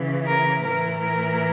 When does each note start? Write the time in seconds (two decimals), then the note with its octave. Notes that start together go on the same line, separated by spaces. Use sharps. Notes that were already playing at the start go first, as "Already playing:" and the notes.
Already playing: C#3 E3
0.27 A#4
0.64 A2 E3 A#4
0.99 A#4